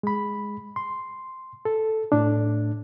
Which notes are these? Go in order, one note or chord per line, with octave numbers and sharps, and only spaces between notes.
G#3 B5
C6
A4
A2 A3 D4